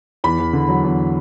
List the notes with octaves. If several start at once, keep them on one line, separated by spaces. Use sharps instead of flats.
E2 B5
E2
D3
F#3
E2